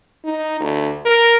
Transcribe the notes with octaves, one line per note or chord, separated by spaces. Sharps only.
D#4
D2
A#4